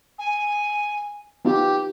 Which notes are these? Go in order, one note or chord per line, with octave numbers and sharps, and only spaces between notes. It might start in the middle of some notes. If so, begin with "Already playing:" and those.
G#5
B3 D#4 F4 G4